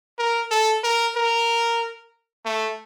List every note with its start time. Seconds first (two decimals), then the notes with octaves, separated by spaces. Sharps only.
0.19 A#4
0.51 A4
0.84 A#4
1.16 A#4
2.46 A3